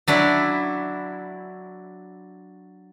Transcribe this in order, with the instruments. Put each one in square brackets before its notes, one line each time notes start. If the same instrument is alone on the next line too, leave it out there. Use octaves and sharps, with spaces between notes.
[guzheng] F#3 D4 E4